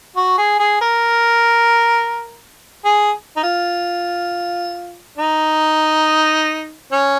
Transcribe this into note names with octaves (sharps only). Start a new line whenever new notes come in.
F#4
G#4
G#4
A#4
G#4
D#4
F4
D#4
C#4